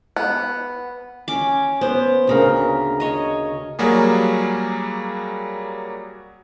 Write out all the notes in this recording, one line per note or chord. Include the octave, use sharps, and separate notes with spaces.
B3
C#4 D6
B3 C5
D2 C#3 A#4
C#5 D#5
F#3 G3 A#3 F#4 G#4